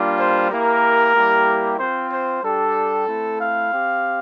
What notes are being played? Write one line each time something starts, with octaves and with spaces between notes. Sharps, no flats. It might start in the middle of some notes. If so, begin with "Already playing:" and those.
Already playing: G3 A#3 D4 F4
C5
A#3 E4 G4 A#4
G3 A#3 E4 G4
C4 F4 C5
C5
G3 D4 G4 A4
A3 C4 E4
F5
C4 G4